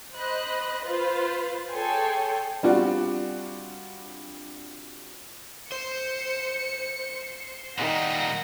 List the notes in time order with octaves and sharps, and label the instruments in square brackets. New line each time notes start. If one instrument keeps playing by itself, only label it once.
[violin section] C5 D#5 B5 F#6
F4 B4 C5
G#4 A4 C#5 G5 G#5 C6
[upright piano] G3 C4 D4 F4 F#4
[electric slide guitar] C5 [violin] C#7
[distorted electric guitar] A#2 G3 [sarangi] D#3 [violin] F#5 A#6